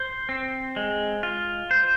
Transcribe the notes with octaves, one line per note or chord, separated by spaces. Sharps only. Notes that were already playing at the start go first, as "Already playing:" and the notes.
Already playing: C5
C4
G#3
F4
C5